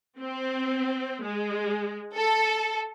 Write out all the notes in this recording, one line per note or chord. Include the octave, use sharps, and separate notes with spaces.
C4
G#3
A4